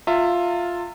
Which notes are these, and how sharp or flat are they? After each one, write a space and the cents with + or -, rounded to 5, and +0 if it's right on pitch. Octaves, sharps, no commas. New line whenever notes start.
F4 +5 E5 +10 A#5 -40